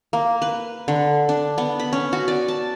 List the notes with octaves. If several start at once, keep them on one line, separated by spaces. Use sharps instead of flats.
A#3
B4
D3
D4
B3
B5
C#4
F#4
D5
A5